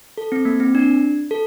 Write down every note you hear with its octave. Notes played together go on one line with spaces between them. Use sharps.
A4
C4
A#3
C4
D4
A4